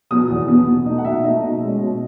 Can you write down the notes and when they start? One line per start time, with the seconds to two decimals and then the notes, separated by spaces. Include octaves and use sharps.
0.11 B2 F#3 B3 D#6
0.30 E2
0.48 B2 F#3 B3
0.67 B2
0.86 A3 D#4
0.98 F#5
1.04 B2 E5
1.23 A3 D#4 D#5
1.42 B2
1.61 G#3 C#4
1.79 B2